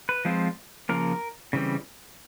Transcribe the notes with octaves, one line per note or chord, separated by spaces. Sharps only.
B4
F3 G#3 C4 F4
C#3 F3 A#3 A#4
C#3 E3 G3 C4